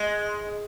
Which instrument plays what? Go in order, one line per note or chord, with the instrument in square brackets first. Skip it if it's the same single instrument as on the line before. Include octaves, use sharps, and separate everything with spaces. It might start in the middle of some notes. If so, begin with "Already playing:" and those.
Already playing: [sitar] G#3